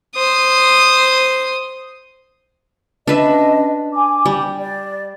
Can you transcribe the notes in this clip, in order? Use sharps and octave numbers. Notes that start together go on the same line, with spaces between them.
C5 D#6
C#4 D4 B4 D#5 E5
G#5 D6
G3
D5